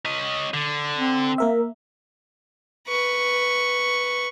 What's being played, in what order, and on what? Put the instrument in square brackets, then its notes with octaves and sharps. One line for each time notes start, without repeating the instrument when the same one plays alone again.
[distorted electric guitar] C#4 D#5
D3
[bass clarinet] C4
[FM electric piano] A#3 A#4 E5
[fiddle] B4 C#6